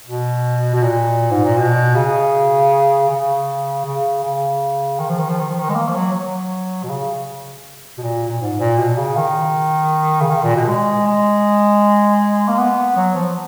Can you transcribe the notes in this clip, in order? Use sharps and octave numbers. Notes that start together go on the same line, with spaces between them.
B2
B2
A#2
G#2
A#2
B2
C#3
C#3
C#3
C#3
D#3
F3
D#3
F3
D#3
F3
D#3
G#3
A#3
F3
F#3
F#3
B2
C#3
B2
A#2
A#2
G#2
A#2
B2
C#3
D#3
C#3
D#3
A#2
B2
G#3
G#3
A#3
B3
F#3
F3